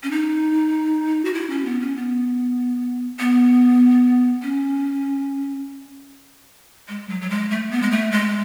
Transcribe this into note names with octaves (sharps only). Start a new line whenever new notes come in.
C#4
D#4
F#4
E4
C#4
B3
C#4
B3
B3
C#4
G#3
F#3
F#3
G#3
A3
B3
G#3
A3
G#3